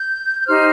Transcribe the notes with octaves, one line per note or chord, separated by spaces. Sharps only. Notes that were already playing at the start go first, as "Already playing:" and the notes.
Already playing: G6
G6
D#4 G4 C5 F6